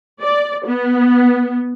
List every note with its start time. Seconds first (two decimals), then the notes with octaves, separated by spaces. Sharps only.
0.21 D5
0.67 B3